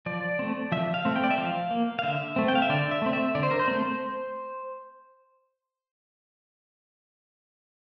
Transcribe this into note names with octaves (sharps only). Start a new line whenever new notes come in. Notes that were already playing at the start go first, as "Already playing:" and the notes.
F3 D5
A3 C4
F3 E5
F5
A3 C4
G5
D5
E5
F3 F5
A#3
F5
D3 E5
A3 C4
G5
F5
E5
D3 D5
E5
A3 C4
E5
D3 D5
C5
A#4
C5
A3 C4